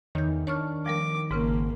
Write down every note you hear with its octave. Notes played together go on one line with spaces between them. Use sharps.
E2 D#3 C#5 G6
D4 C#5 C#6 F6
F3 G3 A#4 D6
G#1 G#2 C#3 A#3 C#4